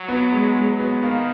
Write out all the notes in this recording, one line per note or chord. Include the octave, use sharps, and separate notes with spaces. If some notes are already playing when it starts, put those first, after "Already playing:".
Already playing: F#3
B3
G#3
G#3
B3
D#3 A#3